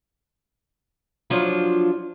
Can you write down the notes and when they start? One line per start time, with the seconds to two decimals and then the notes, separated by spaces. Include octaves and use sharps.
1.30 F3 F#3 D4 F4